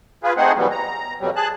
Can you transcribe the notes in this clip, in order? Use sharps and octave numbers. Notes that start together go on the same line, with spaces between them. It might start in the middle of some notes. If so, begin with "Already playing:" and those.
F4 G#4 B4
A3 C4 D#4 G#4 C5 F#5
B2 E3 F#3 G3 B3
A#5
F2 B2 F#3 G3
G#4 A5 F#6